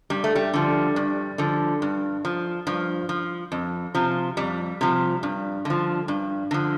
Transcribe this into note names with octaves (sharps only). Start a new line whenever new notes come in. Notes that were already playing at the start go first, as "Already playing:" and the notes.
G2 G3
A3
G3
D3 F3
G2
D3 F3
G2
F3
G2 F3
F3
F2
C3 F3
F2 G3
C3 F3
G2
D3 F3
G2
D3 F3